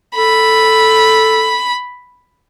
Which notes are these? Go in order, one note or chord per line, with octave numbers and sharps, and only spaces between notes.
A4 B5